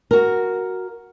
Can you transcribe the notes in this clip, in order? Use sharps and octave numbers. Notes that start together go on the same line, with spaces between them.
F#4 A#4